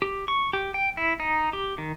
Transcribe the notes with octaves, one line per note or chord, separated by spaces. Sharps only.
G4
C#6
G4
G5
E4
D#4
G4
D#3